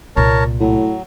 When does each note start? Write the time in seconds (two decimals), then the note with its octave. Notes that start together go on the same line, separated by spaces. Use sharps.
0.16 C2 A#2 A#4 C#5 A5
0.60 A2 F#3